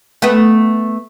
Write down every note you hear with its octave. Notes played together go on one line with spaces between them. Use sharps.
A3 B3